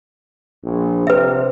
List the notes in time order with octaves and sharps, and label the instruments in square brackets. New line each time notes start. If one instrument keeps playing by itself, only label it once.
[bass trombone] A#1
[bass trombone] C3 [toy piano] B4 E5